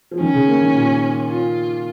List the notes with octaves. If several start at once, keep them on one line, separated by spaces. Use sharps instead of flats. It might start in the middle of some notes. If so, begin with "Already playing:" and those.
F3
D#3 C#4
C#3
A#3
D#3
A#2
F4